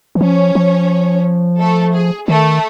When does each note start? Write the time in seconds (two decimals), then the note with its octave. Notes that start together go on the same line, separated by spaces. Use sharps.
0.15 E3
0.21 F3 C#4 C#5
0.55 F3
1.59 A3 A4
1.94 G#4
2.28 D#3 A3 A4